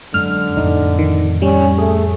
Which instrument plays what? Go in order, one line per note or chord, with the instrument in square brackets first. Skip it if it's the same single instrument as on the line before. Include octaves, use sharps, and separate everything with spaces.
[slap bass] F#2 G#3 [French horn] D3 [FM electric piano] F6
[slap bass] F2 A2 [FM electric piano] D#4
[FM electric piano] D#3
[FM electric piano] G3 [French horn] C#4
[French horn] A3 [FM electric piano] G#4